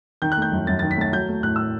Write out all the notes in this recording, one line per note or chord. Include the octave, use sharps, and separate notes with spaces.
D#3 G6
F#6
A3 G6
F#2
F#2 A6
A6
D#3
B6
A3 A6
F#3 G6
A3
A2 F#6
A2 E6